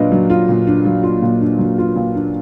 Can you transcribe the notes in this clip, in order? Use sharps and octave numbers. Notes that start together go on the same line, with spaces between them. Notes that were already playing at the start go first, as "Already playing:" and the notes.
Already playing: A#2 F#3 D4 F4 B4 D5 D#5 F5
F#3
F4
A#2
D4
F#3
F4
A#2
D4
F#3
F4
A#2
D4